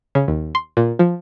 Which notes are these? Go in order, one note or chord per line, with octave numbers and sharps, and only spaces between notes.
C#3
D#2
C6
A#2
F3